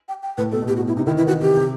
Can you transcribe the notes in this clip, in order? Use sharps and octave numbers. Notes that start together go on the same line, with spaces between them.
G5
G5
A2 B4
B2 A4
B2
A2 G4
F#4
B2
E4
C3 D#4
D#3 E4
E3 E4
D#3 F#4
C3 G4
C3